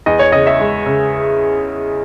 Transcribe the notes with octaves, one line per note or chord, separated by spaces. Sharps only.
E2 D#5
C#5
C#3 D#5
E5
G#3
C#3